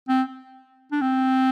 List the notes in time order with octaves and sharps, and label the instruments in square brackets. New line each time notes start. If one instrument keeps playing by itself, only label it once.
[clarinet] C4
D4
C4